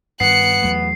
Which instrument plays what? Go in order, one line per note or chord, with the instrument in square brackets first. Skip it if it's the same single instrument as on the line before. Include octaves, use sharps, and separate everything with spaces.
[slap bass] G2 D#3 [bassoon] B3 [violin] F#6 C#7 [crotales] C7
[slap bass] E2 F#3 A3